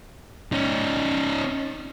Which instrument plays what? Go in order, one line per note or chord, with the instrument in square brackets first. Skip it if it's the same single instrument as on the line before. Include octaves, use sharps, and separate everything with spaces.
[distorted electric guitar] C#4 D#4